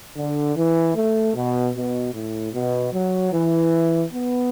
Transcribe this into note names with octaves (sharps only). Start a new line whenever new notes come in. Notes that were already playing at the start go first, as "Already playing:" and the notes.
D3
E3
A3
B2
B2
A2
B2
F#3
E3
B3